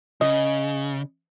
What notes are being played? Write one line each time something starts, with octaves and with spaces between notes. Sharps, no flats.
C#3 D#5